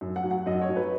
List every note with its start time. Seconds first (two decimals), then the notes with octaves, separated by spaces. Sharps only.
0.01 F#2
0.16 F#5
0.24 F#3
0.31 F#5
0.46 F#2 D#5
0.61 C#5
0.69 F#3
0.77 B4